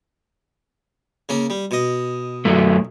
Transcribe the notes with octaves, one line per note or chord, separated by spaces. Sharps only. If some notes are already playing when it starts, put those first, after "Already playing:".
C#3 A#3 C#4
G3
B2 D#5
F#2 F#3 A3